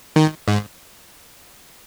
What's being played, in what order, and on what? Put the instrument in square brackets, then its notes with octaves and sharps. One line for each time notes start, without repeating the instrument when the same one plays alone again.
[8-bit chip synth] D#3
G#2